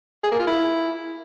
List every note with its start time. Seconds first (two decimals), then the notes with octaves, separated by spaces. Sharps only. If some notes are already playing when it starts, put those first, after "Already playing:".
0.24 G#4
0.31 A#3
0.39 F4
0.47 E4